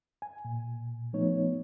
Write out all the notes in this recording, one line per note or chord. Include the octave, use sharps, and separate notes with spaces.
G#5
A#2
F3 A3 B3 D#4 C#5